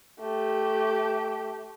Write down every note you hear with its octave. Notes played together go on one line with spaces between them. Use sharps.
A3 G4